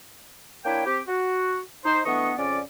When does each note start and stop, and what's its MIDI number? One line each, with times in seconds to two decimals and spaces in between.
0.65 0.82 58
0.65 0.82 62
0.65 0.82 64
0.65 0.82 73
0.65 0.82 79
0.86 1.01 60
0.86 1.01 67
1.08 1.60 66
1.85 2.00 63
1.85 2.00 72
2.06 2.33 52
2.06 2.33 57
2.06 2.33 59
2.06 2.33 62
2.06 2.33 75
2.06 2.33 85
2.38 2.60 41
2.38 2.60 49
2.38 2.60 61
2.38 2.60 74